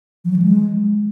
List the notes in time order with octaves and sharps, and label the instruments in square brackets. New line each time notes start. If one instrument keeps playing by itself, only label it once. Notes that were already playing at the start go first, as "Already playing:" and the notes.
[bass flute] F3
F#3
E3
G#3